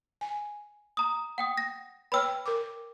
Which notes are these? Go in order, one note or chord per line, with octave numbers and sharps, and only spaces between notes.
G#5
A#5 D#6
F#5 G5 D#6
A#6
B4 C#5 G5 B5 E6 F6
A#4 D6